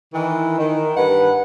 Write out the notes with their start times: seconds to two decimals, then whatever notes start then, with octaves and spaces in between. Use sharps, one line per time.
0.14 D#3 E3
0.58 D#3
0.97 G2 B4 F#5